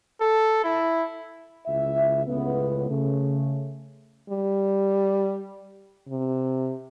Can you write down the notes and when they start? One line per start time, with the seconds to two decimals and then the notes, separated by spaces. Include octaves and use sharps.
0.21 A4
0.64 E4
1.67 C#2 E4 E5
2.26 C#2 A2 C#3 B3
2.89 C#3 A3
4.30 G3
6.09 C3